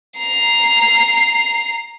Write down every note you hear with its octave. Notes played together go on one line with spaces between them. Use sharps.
A#5 C7